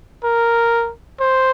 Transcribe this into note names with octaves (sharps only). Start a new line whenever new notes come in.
A#4
C5